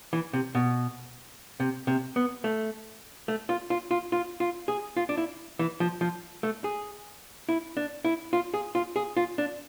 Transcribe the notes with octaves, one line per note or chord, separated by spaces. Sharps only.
E3
C3
B2
C3
C3
B3
A3
A3
F4
F4
F4
F4
F4
G#4
F4
D4
E4
E3
F3
F3
A3
G#4
E4
D4
E4
F4
G#4
F4
G#4
F4
D4